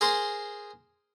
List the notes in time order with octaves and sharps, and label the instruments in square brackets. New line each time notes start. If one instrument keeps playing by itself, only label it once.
[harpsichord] G#4 A#4 C5 C6